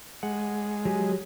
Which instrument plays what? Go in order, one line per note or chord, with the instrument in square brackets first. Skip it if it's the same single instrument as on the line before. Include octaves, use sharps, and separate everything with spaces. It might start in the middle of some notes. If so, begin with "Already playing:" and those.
[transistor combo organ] G#3 [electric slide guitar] F#5
[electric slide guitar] F#3 G4 G#5